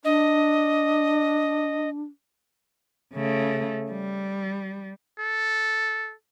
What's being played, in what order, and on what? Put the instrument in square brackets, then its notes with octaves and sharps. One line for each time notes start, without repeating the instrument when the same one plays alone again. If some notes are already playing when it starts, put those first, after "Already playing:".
[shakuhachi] D4 [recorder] D#5
[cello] C#3 A3
G3
[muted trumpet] A4